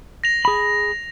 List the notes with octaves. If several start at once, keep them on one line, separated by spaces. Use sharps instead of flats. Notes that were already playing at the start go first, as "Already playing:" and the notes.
A#6 F7
G#4 B5